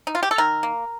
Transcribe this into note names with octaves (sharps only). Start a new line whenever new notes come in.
D#4
F4
G4
A4
D#3 A#4
A#3